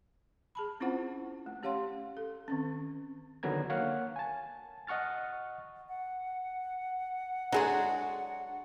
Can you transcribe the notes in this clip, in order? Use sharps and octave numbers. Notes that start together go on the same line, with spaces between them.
G#4 A5 B5
C4 C#4 E4 F4 C5 F#5
A3
C#4 G4 C#5 F5 F#5 C6
A4
D#3 C4 C#4
D3 D#3 F#3 B3 A#5 G#6
A#3 C#5 F5 F#5
G#5 A5
D#5 F#5 C#6 F6 A6
F#5
F#3 G#3 D4 F#4 G#4